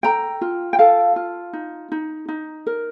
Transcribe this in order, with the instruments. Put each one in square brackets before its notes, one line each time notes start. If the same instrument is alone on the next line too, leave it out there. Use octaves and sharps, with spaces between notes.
[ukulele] A4 G5 A#5
F4
G5
A4 F5 A5
F4
D#4
D#4
D#4
A#4